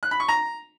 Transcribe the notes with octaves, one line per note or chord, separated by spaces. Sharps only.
F#6
B5
C#6
A#5